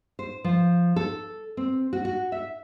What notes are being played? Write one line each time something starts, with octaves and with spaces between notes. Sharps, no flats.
C5
F3
A4
C4
F#4
F#4
E5